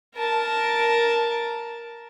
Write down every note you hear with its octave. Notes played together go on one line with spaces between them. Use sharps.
A#4 A5